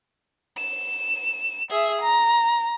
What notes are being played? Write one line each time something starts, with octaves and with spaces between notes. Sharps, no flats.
E7
G#4 E5
A#5